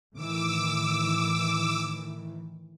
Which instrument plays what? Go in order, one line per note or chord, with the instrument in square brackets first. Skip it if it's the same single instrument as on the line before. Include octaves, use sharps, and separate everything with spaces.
[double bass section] A2 D#3 E3 [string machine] D6 E6